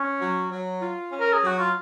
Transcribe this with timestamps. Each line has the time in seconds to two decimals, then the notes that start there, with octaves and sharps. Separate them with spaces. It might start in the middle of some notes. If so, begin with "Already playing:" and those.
Already playing: C#4
0.20 F#3
0.51 F#3
0.82 F4
1.12 C#4
1.20 A#4
1.34 G#4
1.42 F#3 F#4
1.59 F4